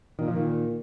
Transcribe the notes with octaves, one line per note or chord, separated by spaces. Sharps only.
A#2 D#3
F3
D#3